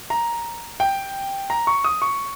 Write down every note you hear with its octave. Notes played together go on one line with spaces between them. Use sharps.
A#5
G5
A#5
C#6
D#6
C#6